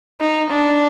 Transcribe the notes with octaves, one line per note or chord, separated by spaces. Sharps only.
D#4
D4